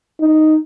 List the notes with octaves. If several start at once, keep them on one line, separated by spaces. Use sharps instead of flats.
D#4